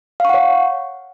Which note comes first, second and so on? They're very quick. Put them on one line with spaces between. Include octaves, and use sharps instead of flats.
F5 C#6 F#5 C#5